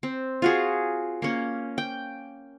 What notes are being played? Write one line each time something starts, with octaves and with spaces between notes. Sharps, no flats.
C4
F4 F#4 G#4
A#3 C#4
G5